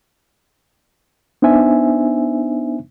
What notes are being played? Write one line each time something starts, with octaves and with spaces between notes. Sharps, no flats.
B3 D4 D#4 C5 E5 G#5